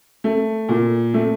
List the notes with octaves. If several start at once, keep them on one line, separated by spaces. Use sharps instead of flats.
A3
A#2
A3